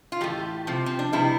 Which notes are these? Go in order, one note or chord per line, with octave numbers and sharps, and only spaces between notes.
F4
A2 E3 A3 G4
C3 F3 C4
C4
D4
C3 G3 B3 E4